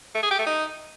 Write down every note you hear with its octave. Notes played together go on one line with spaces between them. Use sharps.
A3
G#4
G4
A3
D#4